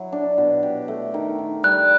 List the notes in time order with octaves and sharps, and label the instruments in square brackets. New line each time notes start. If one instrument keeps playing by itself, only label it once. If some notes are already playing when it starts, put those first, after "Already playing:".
Already playing: [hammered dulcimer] F#3 E4
D4
B2
G4
A3
D#3
D#3
[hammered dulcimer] G3 [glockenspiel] F#6